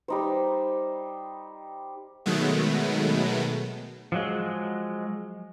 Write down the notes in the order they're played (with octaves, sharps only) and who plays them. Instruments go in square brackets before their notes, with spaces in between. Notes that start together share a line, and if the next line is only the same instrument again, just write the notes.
[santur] G3 D#4 C5
[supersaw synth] B2 D#3 F#3 G#3 A3 B3
[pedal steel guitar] F3 F#3 G#3